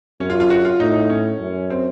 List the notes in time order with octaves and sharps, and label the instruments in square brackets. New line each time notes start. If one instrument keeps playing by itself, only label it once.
[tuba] F#2 [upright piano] C#4
[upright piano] F4
F4
F#4
F4
[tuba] A2 [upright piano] D#4
[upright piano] C#4
[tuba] F#2
[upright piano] C4